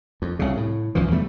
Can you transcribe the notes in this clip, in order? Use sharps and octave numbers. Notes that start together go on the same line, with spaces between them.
F2
C2 C#3
A2
C2 F#2 E3 F3
E2 G3 A3